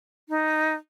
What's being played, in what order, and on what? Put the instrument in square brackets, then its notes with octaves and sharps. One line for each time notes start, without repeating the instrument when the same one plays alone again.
[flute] D#4